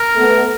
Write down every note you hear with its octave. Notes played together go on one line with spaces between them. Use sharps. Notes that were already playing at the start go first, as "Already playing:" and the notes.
Already playing: A#4
A3 B3